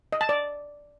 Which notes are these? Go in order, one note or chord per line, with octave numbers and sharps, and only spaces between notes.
D#5
A5
D5